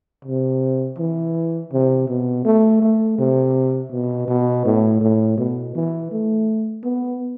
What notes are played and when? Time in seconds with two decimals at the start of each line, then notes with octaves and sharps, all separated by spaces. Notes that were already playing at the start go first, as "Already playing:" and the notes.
0.25 C3
0.99 E3
1.72 C3
2.08 B2
2.45 A3
2.82 A3
3.19 C3
3.92 B2
4.28 B2
4.65 A2
5.01 A2
5.37 B2
5.75 E3
6.11 A3
6.84 B3